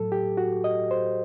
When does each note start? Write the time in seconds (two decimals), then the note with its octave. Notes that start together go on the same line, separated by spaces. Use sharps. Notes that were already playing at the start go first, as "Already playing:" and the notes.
Already playing: A2 F#3 A4
0.12 G4
0.37 F#4
0.64 D#5
0.91 C5